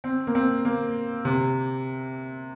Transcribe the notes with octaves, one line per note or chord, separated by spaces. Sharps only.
C4
A#3
C4
A#3
C3